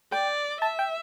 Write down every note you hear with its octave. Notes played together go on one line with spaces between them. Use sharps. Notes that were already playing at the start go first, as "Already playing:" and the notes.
D5 G5
E5 A5
G5